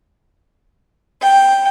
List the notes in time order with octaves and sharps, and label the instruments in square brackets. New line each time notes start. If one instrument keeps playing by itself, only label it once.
[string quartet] G5